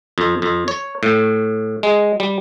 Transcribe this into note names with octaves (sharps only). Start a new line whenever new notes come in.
F2
F2
C#5
A2
G#3
G3